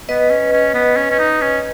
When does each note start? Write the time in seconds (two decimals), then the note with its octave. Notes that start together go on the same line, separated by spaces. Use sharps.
0.09 B3 B4 D#5
0.31 C#4
0.53 C#4
0.74 B3
0.97 C#4
1.11 C#4
1.19 D#4
1.41 C#4